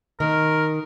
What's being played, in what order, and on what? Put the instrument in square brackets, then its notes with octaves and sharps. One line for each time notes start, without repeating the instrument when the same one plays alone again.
[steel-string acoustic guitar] D#3 [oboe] A#4